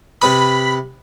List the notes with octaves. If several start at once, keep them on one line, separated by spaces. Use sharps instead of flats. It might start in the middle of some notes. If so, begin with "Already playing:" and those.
C3 B4 B5 D#6